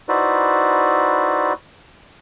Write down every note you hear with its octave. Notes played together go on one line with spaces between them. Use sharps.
D#4 E4 F#4 B4 C5 D5